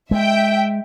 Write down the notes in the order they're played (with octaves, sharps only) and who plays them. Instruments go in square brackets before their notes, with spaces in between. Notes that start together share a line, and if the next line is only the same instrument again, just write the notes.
[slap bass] G#3 [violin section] E5 G5